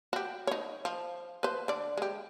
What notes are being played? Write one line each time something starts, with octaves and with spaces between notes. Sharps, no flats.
F#4 G4
D#4 C#5
F3
B4 C5
D3 D5
G#3 G4